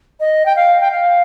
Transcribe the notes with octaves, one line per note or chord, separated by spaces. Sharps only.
D#5
G5
F5
G5
F5